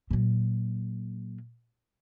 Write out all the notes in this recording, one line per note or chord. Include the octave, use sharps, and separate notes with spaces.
A#2 F#3